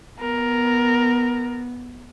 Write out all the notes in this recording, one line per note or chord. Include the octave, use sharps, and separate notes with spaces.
B3 A#4